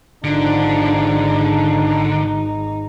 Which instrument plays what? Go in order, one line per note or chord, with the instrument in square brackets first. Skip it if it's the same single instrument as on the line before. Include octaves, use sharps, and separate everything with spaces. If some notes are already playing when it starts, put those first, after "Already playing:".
[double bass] G#1 D#4 [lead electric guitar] D3 [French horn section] F3 D4